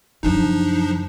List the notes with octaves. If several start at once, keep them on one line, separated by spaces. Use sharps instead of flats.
F#2 C#3 F3 D4 D#4